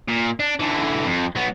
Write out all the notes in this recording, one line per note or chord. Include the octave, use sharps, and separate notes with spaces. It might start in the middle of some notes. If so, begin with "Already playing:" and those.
A#2
D4
D3 E3
F2
F#3 B3